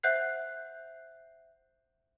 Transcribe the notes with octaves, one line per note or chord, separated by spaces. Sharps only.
C5 E5 F#5 F#6 G6 C7